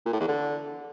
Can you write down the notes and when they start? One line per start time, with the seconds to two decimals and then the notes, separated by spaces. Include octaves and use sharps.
0.06 A#2
0.13 A2
0.20 E2
0.28 D3